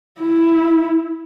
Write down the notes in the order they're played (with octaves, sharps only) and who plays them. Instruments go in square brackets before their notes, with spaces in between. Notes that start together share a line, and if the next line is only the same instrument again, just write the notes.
[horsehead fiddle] E4